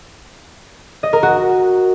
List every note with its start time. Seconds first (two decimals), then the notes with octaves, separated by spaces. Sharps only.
1.03 D#5
1.13 A#4
1.23 F#4